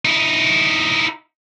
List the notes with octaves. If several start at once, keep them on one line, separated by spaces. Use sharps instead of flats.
D#4 E4